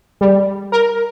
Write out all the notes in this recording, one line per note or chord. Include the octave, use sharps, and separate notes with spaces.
G3
A#4